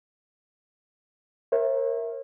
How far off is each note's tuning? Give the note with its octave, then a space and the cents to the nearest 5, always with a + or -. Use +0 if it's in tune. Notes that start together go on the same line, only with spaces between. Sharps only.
A#4 +0 C#5 -40 E5 +0